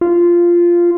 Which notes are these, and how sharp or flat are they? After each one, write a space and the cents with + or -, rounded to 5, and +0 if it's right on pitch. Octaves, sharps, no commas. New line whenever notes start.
F4 -10